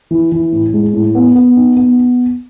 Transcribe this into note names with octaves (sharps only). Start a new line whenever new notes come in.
E3
E3
A2
G#3
A2
B3
B3
D#4
B3